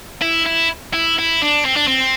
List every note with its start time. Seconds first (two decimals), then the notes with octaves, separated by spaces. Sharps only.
0.21 E4
0.46 E4
0.94 E4
1.19 E4
1.42 D4
1.66 C4
1.77 D4
1.88 C4